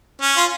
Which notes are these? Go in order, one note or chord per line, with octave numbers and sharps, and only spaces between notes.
C#4
F4